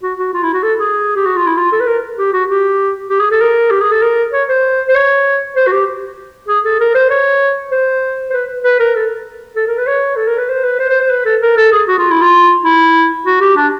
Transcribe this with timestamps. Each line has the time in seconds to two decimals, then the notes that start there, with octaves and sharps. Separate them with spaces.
0.03 F#4
0.18 F#4
0.34 F4
0.43 E4
0.53 F#4
0.63 A4
0.80 G#4
1.16 G4
1.26 F#4
1.36 F4
1.46 E4
1.57 F4
1.72 A4
1.80 B4
1.87 A#4
2.18 G4
2.33 F#4
2.49 G4
3.10 G4
3.20 G#4
3.31 A4
3.41 A#4
3.70 G4
3.81 G#4
3.91 A4
4.02 A#4
4.33 C#5
4.49 C5
4.89 C5
4.95 C#5
5.56 C5
5.67 F#4
5.72 G4
6.48 G#4
6.65 A4
6.80 A#4
6.95 C5
7.10 C#5
7.71 C5
8.30 C5
8.33 B4
8.64 B4
8.80 A#4
8.96 A4
9.56 A4
9.67 A#4
9.78 B4
9.87 C#5
10.16 A4
10.27 A#4
10.38 B4
10.49 C5
10.64 B4
10.79 C5
10.90 C5
11.01 C5
11.10 B4
11.25 A4
11.42 A#4
11.57 A4
11.72 G#4
11.88 F#4
11.98 F4
12.10 E4
12.21 F4
12.65 E4
13.26 F#4
13.41 G4
13.56 D4